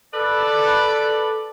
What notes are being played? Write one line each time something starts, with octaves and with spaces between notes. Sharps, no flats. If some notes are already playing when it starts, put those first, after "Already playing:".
A4 B4 D5